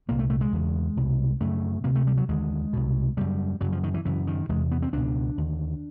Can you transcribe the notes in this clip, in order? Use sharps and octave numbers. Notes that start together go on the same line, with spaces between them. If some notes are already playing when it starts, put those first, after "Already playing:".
C2 A#2 A#3
A3
A3
G#3
E2 C#3
C2 B2
F#2 C#3 A3
D2 C3 A#3
A3
G3
F#3
D#2 D3 G#3
C2 B2
F#2 C#3 G3
F#2 C#3 F#3
F3
D#3
E3
F#2 C#3 E3
D#3
E2 C3 G#3
B3
C4
C#2 B2 D4
D#2 D3